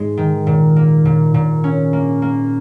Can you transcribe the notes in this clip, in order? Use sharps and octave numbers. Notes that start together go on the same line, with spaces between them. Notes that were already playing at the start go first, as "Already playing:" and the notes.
Already playing: G#2 G#3
D#3
A#2
A#3
A#2
A#2
C#4
A#3
A#3